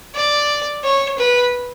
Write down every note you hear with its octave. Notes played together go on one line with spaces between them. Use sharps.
D5
C#5
B4